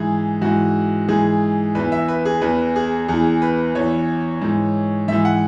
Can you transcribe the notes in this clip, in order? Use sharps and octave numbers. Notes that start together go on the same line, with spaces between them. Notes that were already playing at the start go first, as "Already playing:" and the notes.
Already playing: G#2 E3 G#4
G#2 E3 F#4
G#2 E3 G#4
E2 E3 B4
E5
B4
G#4
E2 E3 B4
G#4
E2 E3 G#4
B4
E2 E3 C#5
G#2 E3
G#2 E3 E5
F#5